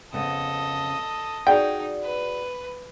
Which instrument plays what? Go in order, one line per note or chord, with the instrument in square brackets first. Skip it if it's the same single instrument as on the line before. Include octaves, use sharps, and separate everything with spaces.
[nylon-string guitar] F2 C#3 B3 [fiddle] A4 D#5
[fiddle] D#4 [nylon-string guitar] F#4 G#4 D5 [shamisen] G5
[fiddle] B4